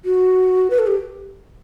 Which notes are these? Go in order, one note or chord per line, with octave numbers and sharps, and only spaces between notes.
F#4
B4
A4
G4